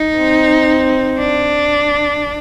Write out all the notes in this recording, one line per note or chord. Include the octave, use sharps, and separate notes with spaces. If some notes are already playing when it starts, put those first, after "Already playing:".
Already playing: D#4
C4
D4